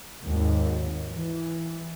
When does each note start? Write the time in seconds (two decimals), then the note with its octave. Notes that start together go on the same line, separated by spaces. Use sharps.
0.22 G#1 D#2 G#2
1.07 E3